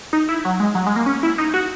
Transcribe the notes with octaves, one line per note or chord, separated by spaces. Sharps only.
D#4
E4
F#3
G#3
F#3
G#3
A#3
C#4
E4
D#4
F#4